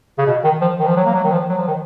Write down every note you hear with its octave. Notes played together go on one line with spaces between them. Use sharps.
C#3
B2
D#3
F3
D#3
F3
F#3
A#3
F#3
D#3
F3
F#3
F3
D#3